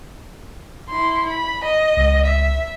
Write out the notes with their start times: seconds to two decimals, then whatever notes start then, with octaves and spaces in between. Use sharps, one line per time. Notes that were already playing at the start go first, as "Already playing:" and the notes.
0.89 E4 C6
1.28 B5
1.64 D#5
1.97 C#2
2.26 E5